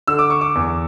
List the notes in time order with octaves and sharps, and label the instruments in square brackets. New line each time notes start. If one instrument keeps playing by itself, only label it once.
[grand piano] D3 E6
D6
C#6
D6
E2